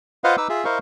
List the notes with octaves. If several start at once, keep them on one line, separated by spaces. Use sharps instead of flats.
F4 B4 C5 D#5 F5 F#5
D#4 B4 D6 E6
F4 G#4 E5
E4 A#4 C5 D#5 F5 C#6